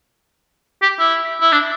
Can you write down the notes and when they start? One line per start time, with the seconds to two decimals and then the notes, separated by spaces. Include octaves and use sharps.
0.82 G4
0.99 E4
1.41 E4
1.52 D4